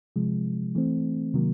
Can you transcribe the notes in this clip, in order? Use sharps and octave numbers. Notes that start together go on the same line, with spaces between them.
C3 F3 G#3
E3 A3 C4
C3 D#3 F#3 A#3